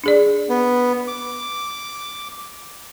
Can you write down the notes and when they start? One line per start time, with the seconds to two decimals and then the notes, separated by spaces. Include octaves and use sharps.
0.04 D4 G#4 D5
0.49 B3
1.08 D6